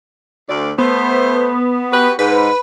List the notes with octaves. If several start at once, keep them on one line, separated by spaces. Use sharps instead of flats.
D2 D5
A3 B3 C5
F#4 G4 B4
G#2 B4